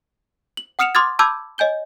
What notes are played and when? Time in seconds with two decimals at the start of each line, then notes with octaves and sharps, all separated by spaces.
0.57 F#7
0.79 F#5 D#6 F6 C#7 E7 F7
0.95 C6 D6 D#6 F6 G#6 A6
1.19 A5 B5 D6 E6 G6 G#6
1.58 C#5 D#5 G#5 G6 G7